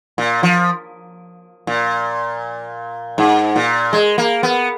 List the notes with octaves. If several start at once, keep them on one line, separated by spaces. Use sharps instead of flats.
A#2
F3
A#2
G#2
A#2
G#3
A#3
B3